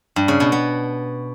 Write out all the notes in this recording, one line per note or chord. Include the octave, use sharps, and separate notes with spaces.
G2
C#3
B2
B3